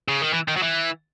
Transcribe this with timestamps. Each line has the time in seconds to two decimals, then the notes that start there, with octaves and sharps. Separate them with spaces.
0.08 C#3
0.21 D#3
0.33 E3
0.48 D#3
0.57 F#3
0.63 E3